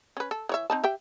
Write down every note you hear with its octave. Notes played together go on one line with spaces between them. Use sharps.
C#4 B4
A4
E3 C#5 E5
C4 D#4 A5
G4 E5 G5